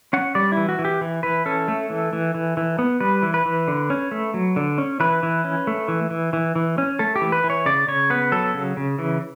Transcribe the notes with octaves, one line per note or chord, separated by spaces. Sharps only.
C#4 F#5
G3 D5
E3 E4
F#4
E3
G4
E3
E3 B4
C#4 A4
A3
E3
E3
E3
E3
B3
G3 B4
E3
B4
E3
D3
C#4
A3
F#3
D3
C#4
E3 B4
E3
C#4
A3
E3
E3
E3
E3
C#4
A3 A4
G4
E3
B4
E3
C#5
C#3 D5
C#3 C#5
B3 B4
F#3 A4
C#3
C#3
E3